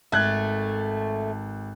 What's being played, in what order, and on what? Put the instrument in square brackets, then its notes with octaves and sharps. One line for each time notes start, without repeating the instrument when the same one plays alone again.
[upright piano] G#1 F#6 G#6 [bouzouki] A3